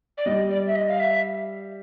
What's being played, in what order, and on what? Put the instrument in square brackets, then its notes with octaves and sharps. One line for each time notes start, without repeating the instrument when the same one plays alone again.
[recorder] D5
[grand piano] G3 [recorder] D#5
[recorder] D5
E5
D#5
F5
E5